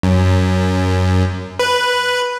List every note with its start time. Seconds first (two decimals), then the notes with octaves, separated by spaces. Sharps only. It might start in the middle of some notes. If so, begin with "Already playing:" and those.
0.03 F#2
1.59 B4